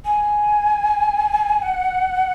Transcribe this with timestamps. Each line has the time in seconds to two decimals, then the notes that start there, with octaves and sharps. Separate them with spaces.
0.05 G#5
1.62 F#5